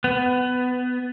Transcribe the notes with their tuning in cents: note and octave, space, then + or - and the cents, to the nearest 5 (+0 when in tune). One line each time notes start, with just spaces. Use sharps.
B3 +20